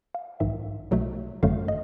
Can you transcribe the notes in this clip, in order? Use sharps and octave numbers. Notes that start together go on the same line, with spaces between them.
F5
A#1 G#2 D#3 E5
B1 B2 F#3 A3
G#1 F#2 D3 F#3 A3 F5
D#5